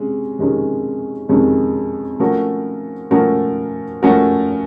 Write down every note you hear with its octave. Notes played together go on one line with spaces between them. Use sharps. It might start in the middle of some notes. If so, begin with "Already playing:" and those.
Already playing: C3 G#3 C#4
F2 C3 D#3 G#3 C#4
F2 C3 D#3 G#3 C#4
F3 A3 C#4 F#4 A#4
F3 A3 C#4 F#4 A#4
F3 A3 C#4 F#4 A#4